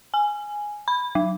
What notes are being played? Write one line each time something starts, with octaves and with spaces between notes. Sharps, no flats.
G#5
B5
F#3